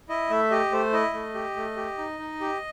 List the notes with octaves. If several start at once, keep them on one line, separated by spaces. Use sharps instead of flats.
E4 D#5
A3 E5
G4 D#5
A3 C5
E4 D#5
A3
G4
A3
G4
D#4
D#4
G4